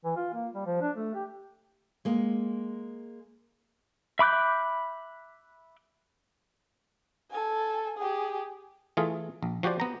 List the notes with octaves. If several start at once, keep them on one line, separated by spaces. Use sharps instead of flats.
E3
F4
A#3
G3
F3
D4
A3
G4
G#3 A#3
E5 B5 D6 F#6 G6
A4 G#5
G4 G#4
E3 A3 F4 G#4
A#1
F3 F#4 G4 C5 D5
B3 A#5